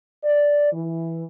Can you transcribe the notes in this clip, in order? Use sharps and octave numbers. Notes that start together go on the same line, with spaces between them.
D5
E3